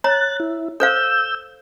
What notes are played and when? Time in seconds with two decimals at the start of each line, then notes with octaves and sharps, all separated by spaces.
0.04 C#5 A#5 F#6 A6
0.40 E4
0.80 A4 C5 F5 E6 G6